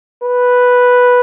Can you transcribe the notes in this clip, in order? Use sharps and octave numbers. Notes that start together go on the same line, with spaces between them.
B4